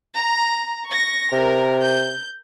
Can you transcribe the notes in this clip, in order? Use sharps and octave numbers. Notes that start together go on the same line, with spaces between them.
A#5
C#6 A#6
C3 A#4
G6